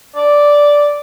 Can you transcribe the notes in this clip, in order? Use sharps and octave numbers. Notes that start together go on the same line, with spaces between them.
D5